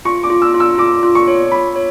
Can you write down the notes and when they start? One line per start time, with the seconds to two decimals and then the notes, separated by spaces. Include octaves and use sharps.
0.05 F4 C#6
0.23 D6
0.30 F4
0.42 E6
0.54 F4
0.60 E6
0.78 F4 D6
1.03 F4
1.15 C#6
1.28 C#5
1.52 F4 B5
1.76 C#5